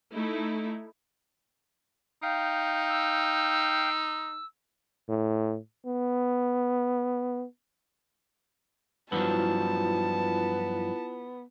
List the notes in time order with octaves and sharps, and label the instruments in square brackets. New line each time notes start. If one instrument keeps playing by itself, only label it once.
[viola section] A3 D#4 E4
[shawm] D#4 [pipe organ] F5 G5
[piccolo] E6
[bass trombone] A2
B3
[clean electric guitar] G2 F3 F#3 [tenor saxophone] B3 [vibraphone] E4 F4 [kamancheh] A5